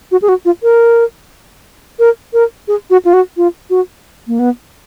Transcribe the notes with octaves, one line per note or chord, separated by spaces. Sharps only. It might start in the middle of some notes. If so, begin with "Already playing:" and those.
F#4
G#4
F#4
F4
A#4
A#4
A#4
G#4
F#4
F4
F#4
F4
F#4
A#3
B3